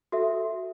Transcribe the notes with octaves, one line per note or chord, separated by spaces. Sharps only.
F#4 A4 E5